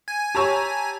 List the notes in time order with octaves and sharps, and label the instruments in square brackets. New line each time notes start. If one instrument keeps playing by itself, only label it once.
[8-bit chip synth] G#5
[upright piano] G4 C#5 [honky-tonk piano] A5 A#5 E6